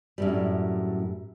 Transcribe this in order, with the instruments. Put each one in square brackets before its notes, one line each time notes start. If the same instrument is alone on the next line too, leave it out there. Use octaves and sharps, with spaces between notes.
[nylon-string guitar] F#2 A2 G3